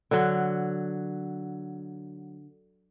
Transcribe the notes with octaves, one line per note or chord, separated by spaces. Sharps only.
D3 F#3